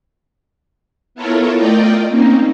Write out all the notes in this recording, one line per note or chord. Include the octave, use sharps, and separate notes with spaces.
B3 E4 F4 A4 A#4 C#5
A3 F4 A#4 D5 D#5 G5
A#3 C4 C#4 D#4